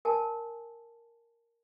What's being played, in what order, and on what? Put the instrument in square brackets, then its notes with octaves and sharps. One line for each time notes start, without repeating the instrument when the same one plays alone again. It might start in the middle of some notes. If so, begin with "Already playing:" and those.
[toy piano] A#4 G#5 A5